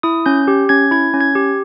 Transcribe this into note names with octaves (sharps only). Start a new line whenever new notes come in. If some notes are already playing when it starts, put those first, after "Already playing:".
E4 D#6
C#4 G6
G4
C#4 G#6
E4 G#6
C#4
G#6
G4